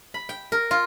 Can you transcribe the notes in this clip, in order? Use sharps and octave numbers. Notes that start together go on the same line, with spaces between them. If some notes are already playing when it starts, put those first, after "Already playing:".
B5
G5
A#4
F4